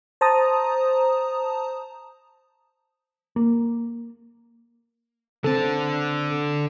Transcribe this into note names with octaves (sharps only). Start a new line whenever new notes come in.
C5 A5 A#5 D#6
A#3
D3 C4 A4 A5